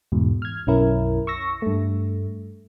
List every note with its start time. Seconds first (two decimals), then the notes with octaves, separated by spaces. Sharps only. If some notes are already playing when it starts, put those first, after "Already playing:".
0.12 E2 G#2 B2
0.42 F6 G#6
0.67 B1 F#2 C#4 E4 A#4
1.27 C#6 E6 A#6
1.62 G2 A3